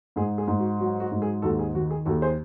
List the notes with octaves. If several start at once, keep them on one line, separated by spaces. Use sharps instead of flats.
G#2 G#4
G#4
G#2
F#4
F#3 F#4
F#4
G#2
G#4
D#2 F#4 A4
G#4
D#3 F#4
G#4
D#2 F#4 A4
G#4 C5